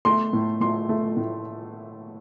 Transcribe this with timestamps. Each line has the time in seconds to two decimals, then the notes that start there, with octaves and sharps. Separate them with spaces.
0.05 A3 C6
0.33 A2
0.61 A2 C6
0.89 A3
1.17 A2